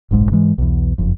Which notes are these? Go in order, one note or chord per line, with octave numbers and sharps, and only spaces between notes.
F#1 B1 G#2 G#3
G#2 E3 G#3
B1 E2
F#1 F2